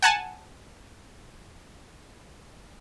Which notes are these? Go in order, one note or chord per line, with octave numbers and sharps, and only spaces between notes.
F#5 G#5 A5